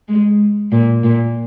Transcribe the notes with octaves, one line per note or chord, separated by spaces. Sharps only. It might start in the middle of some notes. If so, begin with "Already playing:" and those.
G#3
A#2
A#2